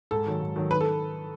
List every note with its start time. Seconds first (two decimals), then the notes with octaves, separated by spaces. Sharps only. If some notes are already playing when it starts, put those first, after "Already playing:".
0.11 G#2 A4
0.26 D#3 F#3
0.41 G#2
0.56 D#3 F#3
0.70 D#3 B4
0.81 A4